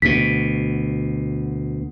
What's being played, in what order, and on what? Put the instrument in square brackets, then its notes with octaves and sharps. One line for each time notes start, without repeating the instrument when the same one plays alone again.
[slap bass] D2 B2 [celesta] B6